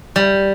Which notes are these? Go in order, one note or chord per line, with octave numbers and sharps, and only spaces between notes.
G3